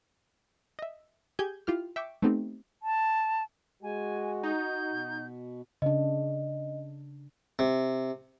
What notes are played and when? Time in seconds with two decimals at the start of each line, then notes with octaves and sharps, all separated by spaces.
0.79 D#5 E5
1.39 G4 G#4 G#5 G6 G#6
1.67 E4 F4 G4 F6
1.96 E5 G5 C#6 D6
2.22 A3 B3 C4 D#4 G4
2.83 A5
3.83 G#3 F#4 G#5
4.43 D#4 G6
4.92 B2
5.82 C#3 D4 D#5
7.59 C3